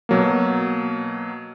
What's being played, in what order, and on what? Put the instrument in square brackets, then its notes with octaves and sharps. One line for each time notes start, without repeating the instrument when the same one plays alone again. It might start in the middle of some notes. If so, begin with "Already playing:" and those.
[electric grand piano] B2 F#3 A#3